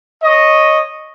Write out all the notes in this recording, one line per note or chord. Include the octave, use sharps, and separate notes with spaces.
C#5 D#5